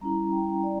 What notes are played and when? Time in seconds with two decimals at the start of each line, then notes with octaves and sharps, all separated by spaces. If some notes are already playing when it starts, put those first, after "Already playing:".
0.01 G3 C#4 E4 A#5
0.32 G5
0.63 D5